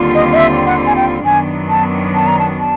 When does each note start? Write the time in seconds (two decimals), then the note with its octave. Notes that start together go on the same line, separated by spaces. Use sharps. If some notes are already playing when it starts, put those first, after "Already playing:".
Already playing: D#2 D3 G3 C4 F4
0.14 D#5
0.33 D#5
0.36 E5
0.66 F#5
0.86 G#5
0.96 G5
1.25 F#2 D#3 F#3 B3 D4 G#5
1.69 A5
2.14 A5
2.27 A#5
2.39 A5
2.59 A5